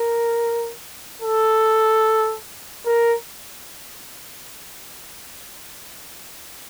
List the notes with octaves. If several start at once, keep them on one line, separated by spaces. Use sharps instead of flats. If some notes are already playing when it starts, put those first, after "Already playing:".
Already playing: A#4
A4
A#4